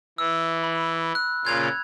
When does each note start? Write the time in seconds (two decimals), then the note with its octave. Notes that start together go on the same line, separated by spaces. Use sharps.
0.18 E3 E6
0.63 B5
1.15 F#6
1.45 A#2 C#3 F4 F#6 G#6 F7